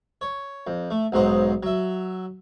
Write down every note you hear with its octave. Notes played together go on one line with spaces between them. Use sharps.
C#5
F2
A3
B1 G#2 F#3 C5 D#5
F#3 E5